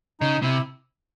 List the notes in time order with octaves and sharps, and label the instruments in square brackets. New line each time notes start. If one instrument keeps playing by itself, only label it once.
[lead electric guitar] C#3 [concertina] D#4
[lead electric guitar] C3 [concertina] E4